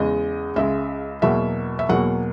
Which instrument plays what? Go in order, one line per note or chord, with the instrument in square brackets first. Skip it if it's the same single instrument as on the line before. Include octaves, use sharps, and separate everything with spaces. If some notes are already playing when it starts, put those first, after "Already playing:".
Already playing: [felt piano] E2 C#3 G#3 D#5
C#2 C#3 G#3 E5
E2 B2 F#3 A#3 E5
E5
E2 B2 F#3 A#3 F#5